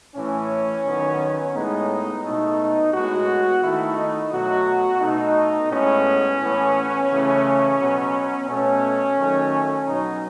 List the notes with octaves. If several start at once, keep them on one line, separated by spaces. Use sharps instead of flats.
A2 E3 A3 C#4
D#3 F#3 B3
A2 G#3 B3 D#4
B2 A3 D#4
A2 G#3 B3 F#4
D#3 A3 E4
D#4
B2 F#3 A3 F#4
B2 A3 D#4
A2 G#3 B3 C#4
A2 E3 B3
C#3 E3 A3
B2 F#3 B3
B2 A3 C#4
D#3 F#3 A3
B2 F#3 B3 D#4